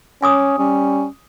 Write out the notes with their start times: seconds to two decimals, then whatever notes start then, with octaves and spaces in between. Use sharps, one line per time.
0.22 C#4 G#5 D6 D#6
0.59 G3 C#4